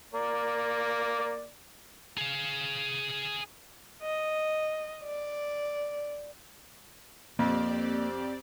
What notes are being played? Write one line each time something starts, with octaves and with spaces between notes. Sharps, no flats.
A#3 D5
G#4 F5
D#5
D5
F2 A#3 C4 G4 D5